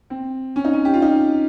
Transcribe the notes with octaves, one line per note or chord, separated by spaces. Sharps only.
C4
C#4
D#4
C#4
G4
F4
D#4